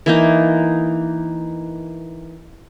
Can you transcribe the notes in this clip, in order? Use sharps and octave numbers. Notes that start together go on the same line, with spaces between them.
E3 A#3 D#4